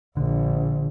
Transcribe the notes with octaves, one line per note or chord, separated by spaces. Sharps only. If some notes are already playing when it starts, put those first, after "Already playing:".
A#1 D3